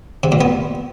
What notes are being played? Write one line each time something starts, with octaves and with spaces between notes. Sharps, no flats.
C3
A#2
B3